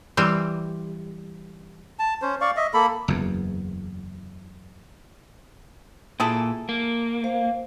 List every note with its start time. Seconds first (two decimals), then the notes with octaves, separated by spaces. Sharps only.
0.17 E3 G3 C4
1.99 A5
2.22 C#4 C5
2.41 D5 F5 C#6
2.56 D#5 E5
2.74 A#3 A4 B5
3.08 F#1 E2
6.20 A#2 E4 G#4 A4
6.69 A#3
7.24 C5 F5